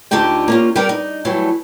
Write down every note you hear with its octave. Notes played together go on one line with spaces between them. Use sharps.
D2 D3 D#4 F4 G4 G5
A#3 C#4 F4
G3 G4 A#4 B4 D5
D#4
E3 F#3 G3 A3